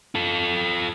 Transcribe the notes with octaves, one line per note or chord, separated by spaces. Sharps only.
F4 A4